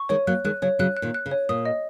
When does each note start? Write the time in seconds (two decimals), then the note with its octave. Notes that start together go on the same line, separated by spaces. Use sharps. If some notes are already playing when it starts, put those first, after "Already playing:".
Already playing: C#6
0.09 D#3 G#3 C#5
0.27 F#3 A#3 F#6
0.44 D#3 G#3 F#6
0.62 C#3 F#3 C#5
0.79 C#3 F#3 F#6
0.97 F#6
1.02 A#2 D#3
1.14 F#6
1.26 C#3
1.31 C#5
1.49 A#2 D#6
1.65 D#5